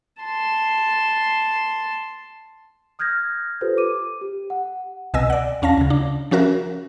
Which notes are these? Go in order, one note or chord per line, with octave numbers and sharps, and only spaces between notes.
A5 C6
D#6 F6 G6 G#6 A#6
F4 G4 A4 B4 C5
D6 D#7
G4
F#5
C2 B2 D#5 G#5 E6 A#6
D5 F#5
E2 C#4 F5 A5 A#6
D2 C#3
D4
F3 C#4 F#4 A#4 E5